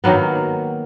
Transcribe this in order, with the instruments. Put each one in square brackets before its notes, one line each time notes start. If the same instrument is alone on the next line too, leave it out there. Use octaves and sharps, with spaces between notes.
[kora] D#3 F#3 A#3 B3